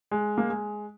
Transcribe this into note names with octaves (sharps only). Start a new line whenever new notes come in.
G#3
A#3
G#3